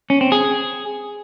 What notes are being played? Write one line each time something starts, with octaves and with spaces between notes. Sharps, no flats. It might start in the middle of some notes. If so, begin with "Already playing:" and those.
C#4
C4
G#4